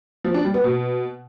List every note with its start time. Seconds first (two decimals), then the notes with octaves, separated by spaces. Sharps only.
0.24 F3
0.34 D4
0.44 G3
0.54 B3
0.64 B2